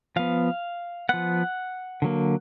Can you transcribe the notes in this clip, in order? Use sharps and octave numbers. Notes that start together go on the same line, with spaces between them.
F3 B3 F5
F3 B3 F#5
D3 F#3 A#3